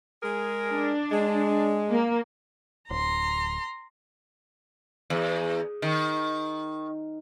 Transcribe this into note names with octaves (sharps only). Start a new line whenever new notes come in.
G#3 G#4 A#4
D4
G#3
A#3
D1 A#5 C6
E2
D#3